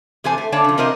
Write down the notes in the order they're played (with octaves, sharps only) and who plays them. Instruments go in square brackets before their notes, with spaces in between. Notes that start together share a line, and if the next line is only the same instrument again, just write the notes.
[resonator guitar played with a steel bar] E2 C3 A4 C5 G#5
A3
D3 A#3 C#5 D5 F5 A5
C#3 F3
C3 C4 F4 A#4 C5 D#5